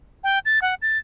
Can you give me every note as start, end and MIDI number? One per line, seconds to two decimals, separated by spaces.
0.24 0.39 79
0.45 0.60 93
0.62 0.75 78
0.82 0.98 93